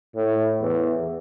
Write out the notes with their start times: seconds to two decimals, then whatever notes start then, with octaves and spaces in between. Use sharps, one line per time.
0.15 A2
0.60 E2